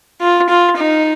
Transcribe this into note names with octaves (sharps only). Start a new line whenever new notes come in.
F4
F4
D#4